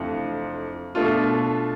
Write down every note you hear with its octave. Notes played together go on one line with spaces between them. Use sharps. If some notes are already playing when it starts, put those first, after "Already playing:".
Already playing: F2 C3 E3 A3 D4
B2 A3 D4 F4